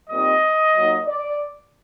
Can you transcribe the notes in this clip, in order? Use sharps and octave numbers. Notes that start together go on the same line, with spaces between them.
A#2 G3 C4 D#4 D#5
A#2 F#3 A#3 D#4
D5